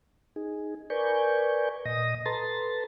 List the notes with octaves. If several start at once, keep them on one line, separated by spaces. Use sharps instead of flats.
D#4 G#4
A#4 B4 D5 G#5 C#6 G6
A#2 D#5 D#6 A#6
A4 B4 A5 A#5 C6 A6